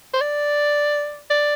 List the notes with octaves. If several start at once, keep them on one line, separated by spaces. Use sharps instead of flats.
C5
D5
D5